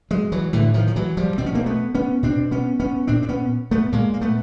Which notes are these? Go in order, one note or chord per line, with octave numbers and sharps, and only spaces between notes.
F#3 G#3
E3 F#3
A2 D3 E3
D#3 F3
F3
E3 F#3
F3 G3
B2 C4
C#4
A#3 C4
A3 B3
B3 C#4
B2 C4 D4
B3 C#4
B3 C#4
A#2 C4 D4
C4
B3 C#4
A3 B3
A#2 G#3 A#3
A#3
A3 B3